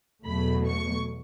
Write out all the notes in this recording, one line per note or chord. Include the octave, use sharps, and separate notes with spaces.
E2 B2 F#3 A3 B5
C#6